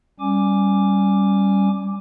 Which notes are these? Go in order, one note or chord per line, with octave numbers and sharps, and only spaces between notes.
G3 C#4 G#5 D6